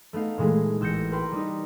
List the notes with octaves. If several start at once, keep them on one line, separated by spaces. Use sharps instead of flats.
A3 B3 D#4 F5
A#2 E3 G#3 A3
A1 E6 G6 A#6 C#7
A#4 B4 G5 C6
G3 D#4